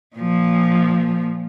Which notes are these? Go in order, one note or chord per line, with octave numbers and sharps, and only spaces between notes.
A#2 F3